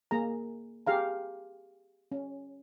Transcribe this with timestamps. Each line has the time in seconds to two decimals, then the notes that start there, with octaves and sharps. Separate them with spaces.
0.11 A#3 G#4 A#5
0.87 G4 G#4 F5 A#5
2.12 C#4